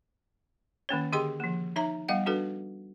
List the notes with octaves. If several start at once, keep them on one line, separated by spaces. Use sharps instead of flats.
D#3 A#3 C#4 C#5
D3 G4 G#4 D#5 G5 C6
F3 A#3
D#4 C#5 E5 A#5
G3 B3 F5 F#5
D4 F#4 A4 B4